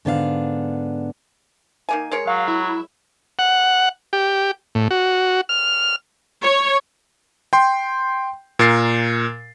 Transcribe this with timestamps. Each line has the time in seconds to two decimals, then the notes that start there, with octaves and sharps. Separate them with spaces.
0.05 G#2 D3 B3 D4 E4 F5
1.89 D#3 A#3 G#5
2.11 G#3 A#4 C#5
2.27 F#3 F5
2.48 E4
3.39 F#5
4.13 G4
4.75 A2
4.91 F#4
5.49 F6
6.42 C#5
7.53 G5 C6
8.59 A#2 A#4 A6 C7